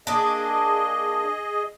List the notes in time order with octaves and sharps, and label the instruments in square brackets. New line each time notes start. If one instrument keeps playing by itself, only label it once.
[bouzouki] A#3 D4 [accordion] G#4 D#5